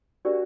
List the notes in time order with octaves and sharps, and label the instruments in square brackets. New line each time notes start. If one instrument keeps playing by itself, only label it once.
[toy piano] D4 G4 A#4 D5 [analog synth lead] F#4